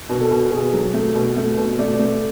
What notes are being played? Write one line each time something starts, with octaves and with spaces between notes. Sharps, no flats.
B2
A4
B2
B2 G#4
F#3
A3
B2
A3
B2
A3 D5
A3